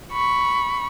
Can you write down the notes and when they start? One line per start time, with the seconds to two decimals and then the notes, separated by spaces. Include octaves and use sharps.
0.12 B5 C#6